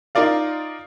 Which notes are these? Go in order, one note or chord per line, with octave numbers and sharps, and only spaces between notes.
D#4 F4 A#4 D5 F5